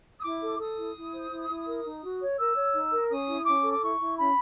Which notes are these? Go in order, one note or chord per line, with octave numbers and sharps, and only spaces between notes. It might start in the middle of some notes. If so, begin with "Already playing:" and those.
D#6
E4 D6
A4
A4 D#6
E4
E4
C5
E4
E4
A#4
D#4
F#4
C#5
A#4 E6
C#5
D#4
A#4
C#4 D#6
E4
C#4 D6
A4
D6
E4 C#6
E4
C#4 B5